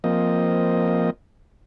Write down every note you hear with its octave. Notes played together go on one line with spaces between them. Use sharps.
F3 A#3 C4 D#5